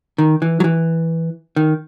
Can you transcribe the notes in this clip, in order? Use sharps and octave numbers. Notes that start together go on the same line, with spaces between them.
D#3
E3
F#3
E3
D#3